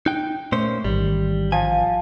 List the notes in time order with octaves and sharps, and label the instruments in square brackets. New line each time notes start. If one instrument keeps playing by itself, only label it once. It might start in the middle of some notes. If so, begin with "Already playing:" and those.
[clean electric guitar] D#4 G5 [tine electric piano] F#6
[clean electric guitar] A#2 C#4 C5 [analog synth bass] A3
[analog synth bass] A1 [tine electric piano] G#2 D#3 [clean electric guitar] G3
[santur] F3 [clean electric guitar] G#5